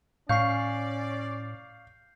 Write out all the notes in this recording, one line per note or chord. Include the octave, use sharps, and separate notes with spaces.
A2 C#4 D5 F5 C#6 G6 C7